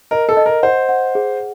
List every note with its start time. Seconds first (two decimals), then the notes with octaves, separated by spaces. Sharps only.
0.11 A#4 D#5
0.29 A4
0.37 D#5
0.46 A#4
0.63 C5 F#5
0.89 F#5
1.15 G#4